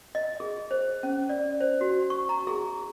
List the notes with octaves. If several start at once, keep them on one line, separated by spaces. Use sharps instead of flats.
D#5
G#4
C5
C#4
D5
C5
F#4
C#6
A#5
G#4